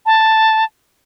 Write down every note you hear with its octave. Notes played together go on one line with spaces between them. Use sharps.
A5